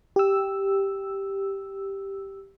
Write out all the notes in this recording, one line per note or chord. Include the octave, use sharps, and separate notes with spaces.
G4 E6